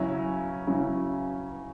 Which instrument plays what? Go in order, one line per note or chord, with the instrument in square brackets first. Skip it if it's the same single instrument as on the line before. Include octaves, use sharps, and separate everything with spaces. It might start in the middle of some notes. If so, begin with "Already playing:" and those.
Already playing: [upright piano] C#3 F#3 C#4 E4
C#3 F#3 C#4 E4